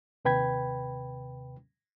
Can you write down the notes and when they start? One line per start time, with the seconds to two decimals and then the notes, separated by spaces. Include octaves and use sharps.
0.25 D#2 C3 B4 G5 B5 G#6